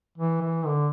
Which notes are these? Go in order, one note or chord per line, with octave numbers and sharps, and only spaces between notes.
E3
E3
D3